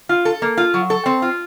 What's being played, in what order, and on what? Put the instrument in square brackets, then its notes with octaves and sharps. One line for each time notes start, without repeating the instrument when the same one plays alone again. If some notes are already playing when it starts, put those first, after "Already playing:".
[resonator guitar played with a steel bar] F4
A4
A#3
F4
F#3
A4
C4
F4